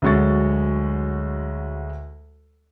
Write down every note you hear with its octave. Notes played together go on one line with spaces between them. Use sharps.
D2 F#3 G#3 C#6 A6